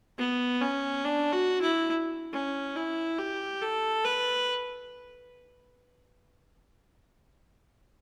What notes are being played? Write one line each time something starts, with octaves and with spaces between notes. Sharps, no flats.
B3
C#4
D4
F#4
E4
C#4
E4
G4
A4
B4